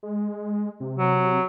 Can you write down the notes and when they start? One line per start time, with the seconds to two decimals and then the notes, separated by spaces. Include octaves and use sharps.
0.03 G#3
0.80 C3
0.98 F#3